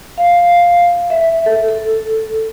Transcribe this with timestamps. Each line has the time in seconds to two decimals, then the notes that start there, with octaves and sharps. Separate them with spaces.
0.18 F5
1.10 E5
1.46 A4
1.68 A4